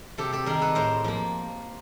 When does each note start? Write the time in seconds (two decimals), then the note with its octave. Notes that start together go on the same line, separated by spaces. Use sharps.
0.18 C3 G4 A4
0.33 G4 A4
0.46 D#3 G3 G#4 A#4
0.61 A4 B4
0.75 A2 A#4 C5
1.04 F3 A#3